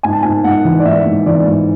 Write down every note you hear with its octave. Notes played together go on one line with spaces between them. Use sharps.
G#2 G#5
A5
G#2 G#5
G#2 F#5
E3
D5
G#2 E5
G#2
E3 D5
G#2